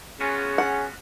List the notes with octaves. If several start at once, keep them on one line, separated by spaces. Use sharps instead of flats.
B3 C#4 F4 F#4 G#4
F#5